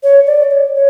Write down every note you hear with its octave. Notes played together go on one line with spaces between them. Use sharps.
C#5
D5
C#5
C#5